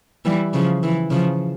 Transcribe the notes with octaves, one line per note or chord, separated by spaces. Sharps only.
E3 G3
C#3 F3
E3
C#3 F3